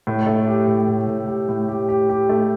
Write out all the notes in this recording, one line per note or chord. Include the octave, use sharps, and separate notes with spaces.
A2
A3
G4
A2
A2
A2
G4
A2
G4
G4
G4
A3